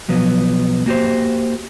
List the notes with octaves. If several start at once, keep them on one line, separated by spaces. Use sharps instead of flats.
B1 F3 F#3 B3
A#3 F#4 G4 C5